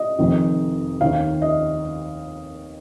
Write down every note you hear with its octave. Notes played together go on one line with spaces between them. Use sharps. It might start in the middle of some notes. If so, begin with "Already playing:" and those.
Already playing: D#5
F1 F2 D#3
D#2 D#3 F5
D#5